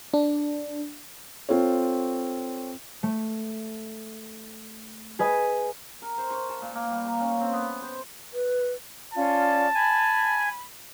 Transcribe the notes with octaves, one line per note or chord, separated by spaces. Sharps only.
D4
C4 F4 A4 C#5
A3
G#4 B4 D#5 G#5
A#4
C5
C#6
A5
A#2
A#3
G3
A#5
C#4
C4
B3
C5
B4
C#4 F4 D5 A5
G#5 B5